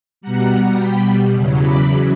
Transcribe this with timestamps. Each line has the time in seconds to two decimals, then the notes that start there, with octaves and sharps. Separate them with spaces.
0.21 B2 G3 F#5 A#5
0.77 G5 B5
1.33 E2 C#3 F#3
1.61 B5 D6